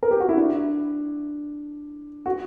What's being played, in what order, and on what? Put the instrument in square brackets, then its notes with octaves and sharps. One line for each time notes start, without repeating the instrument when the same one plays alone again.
[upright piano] A#4
G4
F#4
E4
D4
F#4